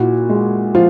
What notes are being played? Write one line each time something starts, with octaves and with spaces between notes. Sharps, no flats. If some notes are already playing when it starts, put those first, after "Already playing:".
Already playing: A#2 E4 F#4
G#3
F3 F4